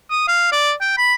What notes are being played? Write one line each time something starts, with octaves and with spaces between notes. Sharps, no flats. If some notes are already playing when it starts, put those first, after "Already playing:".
D#6
F5
D5
G5
B5